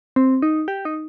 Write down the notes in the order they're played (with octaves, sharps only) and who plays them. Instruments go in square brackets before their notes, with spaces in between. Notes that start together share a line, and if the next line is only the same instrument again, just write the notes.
[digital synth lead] C4
D#4
G4
D#4